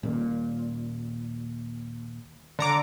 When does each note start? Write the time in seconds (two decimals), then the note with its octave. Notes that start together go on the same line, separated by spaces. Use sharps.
0.03 D#1 A#2
2.59 D3 A#5 D6